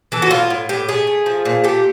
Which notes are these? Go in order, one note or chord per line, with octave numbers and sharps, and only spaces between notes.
E3 A4
F#4
A2 F4
A2
A2 G4
A3 G#4
A3
F3
A#2
A3 G4